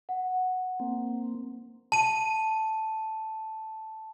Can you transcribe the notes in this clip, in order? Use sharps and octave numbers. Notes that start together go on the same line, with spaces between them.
F#5
A#3 C4
A5 D#7